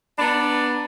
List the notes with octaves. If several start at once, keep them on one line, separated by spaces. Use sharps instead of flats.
B3 D4 A#5 B5